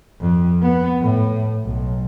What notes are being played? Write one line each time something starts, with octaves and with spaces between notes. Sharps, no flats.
F2
B3
A2
B1